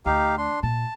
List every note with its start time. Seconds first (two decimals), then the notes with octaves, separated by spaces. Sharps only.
0.06 D2 D#4 G4 F5
0.38 D4 C6
0.63 A#2 A5